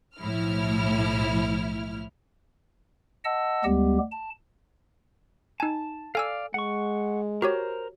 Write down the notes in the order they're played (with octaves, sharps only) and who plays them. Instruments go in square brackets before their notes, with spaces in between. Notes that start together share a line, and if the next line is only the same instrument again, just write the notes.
[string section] B1 A2 F3 E4 F6
[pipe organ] D#5 F#5 A5 E6
D2 G3 G#3 B3 G4
A5
[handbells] D#4 G#5 [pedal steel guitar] A5
[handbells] A4 G#5 E6 [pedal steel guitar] D5 F5
[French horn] G#3 [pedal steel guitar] F#5 C#6
[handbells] F#4 G4 C#5 [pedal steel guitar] A#4 C5